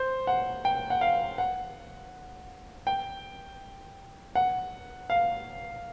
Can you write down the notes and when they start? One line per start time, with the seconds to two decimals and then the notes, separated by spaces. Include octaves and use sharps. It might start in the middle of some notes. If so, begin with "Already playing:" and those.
Already playing: C5
0.27 F#5
0.65 G5
0.90 F#5
1.01 F5
1.38 F#5
2.87 G5
4.35 F#5
5.10 F5